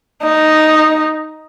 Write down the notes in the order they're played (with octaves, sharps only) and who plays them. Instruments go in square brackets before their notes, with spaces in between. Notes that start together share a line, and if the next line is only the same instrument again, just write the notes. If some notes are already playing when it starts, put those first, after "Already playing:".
[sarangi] D#4